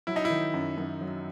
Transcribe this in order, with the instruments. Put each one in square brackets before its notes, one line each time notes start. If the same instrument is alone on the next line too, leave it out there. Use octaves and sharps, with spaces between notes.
[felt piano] F#3 [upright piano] E4
[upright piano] D#4
E4
[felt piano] D#3
F#2
F#2
F#3